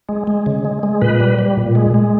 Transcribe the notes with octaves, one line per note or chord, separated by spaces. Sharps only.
G#3
G#3
C#3
G#3
G#3
A#2 B4
G3
G3
A#2
G#3
G#3